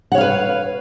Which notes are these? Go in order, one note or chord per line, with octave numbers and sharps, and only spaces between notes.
B4 C#5 F5 F#5